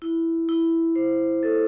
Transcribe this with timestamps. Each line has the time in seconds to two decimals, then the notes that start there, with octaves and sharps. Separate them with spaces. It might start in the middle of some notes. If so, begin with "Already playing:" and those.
0.02 E4
0.49 E4
0.96 C5
1.43 A4